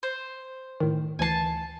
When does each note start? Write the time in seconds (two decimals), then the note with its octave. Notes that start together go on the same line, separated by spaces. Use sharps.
0.03 C5
0.80 A2 D#3
1.19 D2 E3 G#5 A5 C7